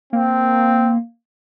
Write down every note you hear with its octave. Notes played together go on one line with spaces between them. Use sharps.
A#3 C4